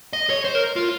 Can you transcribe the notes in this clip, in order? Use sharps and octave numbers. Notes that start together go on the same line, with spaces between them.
D#5
C#5
C5
A#4
F4